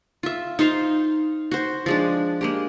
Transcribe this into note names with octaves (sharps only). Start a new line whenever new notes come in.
F4 E5
D#4 F4 C5 F5
F#4 C5
F3 G#3 D4
G#3 A#3 G4